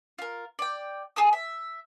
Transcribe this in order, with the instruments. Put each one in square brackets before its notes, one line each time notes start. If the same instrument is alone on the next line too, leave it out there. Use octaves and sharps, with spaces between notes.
[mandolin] F4 A#4
D5 G5
G#4 G#5 A5 D#6
E5